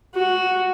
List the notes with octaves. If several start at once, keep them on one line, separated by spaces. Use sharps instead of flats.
F#4